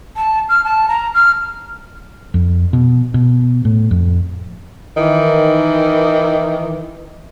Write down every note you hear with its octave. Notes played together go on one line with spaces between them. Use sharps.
A5
F6
A5
A#5
F6
F2
B2
B2
A2
F2
D#3 E3